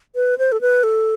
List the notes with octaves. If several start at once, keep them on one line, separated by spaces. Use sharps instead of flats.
B4
C5
A4
B4
A4